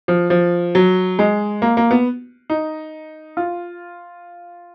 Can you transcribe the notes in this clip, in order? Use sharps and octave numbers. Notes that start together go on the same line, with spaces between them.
F3
F3
F#3
G#3
A#3
A#3
B3
D#4
F4